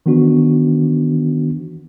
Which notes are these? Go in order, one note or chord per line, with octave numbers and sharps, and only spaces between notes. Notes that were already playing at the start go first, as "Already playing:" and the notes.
D#3 E3 B3 D4 F#4